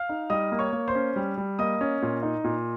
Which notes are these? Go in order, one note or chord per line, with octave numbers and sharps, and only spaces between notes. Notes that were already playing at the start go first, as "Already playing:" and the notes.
Already playing: F5 F6
D#4
G3 D#5 D#6
A#3
C#5 C#6
A#3
C5 C6
C#4
G3
G3
A#3 D#5 D#6
C#4
A#2
D#4
A#2